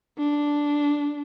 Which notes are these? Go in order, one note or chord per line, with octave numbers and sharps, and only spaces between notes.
D4